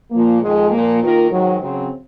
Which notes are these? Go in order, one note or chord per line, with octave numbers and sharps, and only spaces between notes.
A#2 F3 A#3
F2 D#3 G#3
A#2 F3 A#3
D#3 A#3 F4 A#4
G#2 D#3 F#3
C#3 F#3 C4